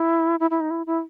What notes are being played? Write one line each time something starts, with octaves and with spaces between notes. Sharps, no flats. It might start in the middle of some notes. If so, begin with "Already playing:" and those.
Already playing: E4
E4
E4
D#4
E4
E4